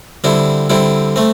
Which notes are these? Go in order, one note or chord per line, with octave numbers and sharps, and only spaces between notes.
D3 G3 C4 E4
D3 G3 C4 E4
A3 C4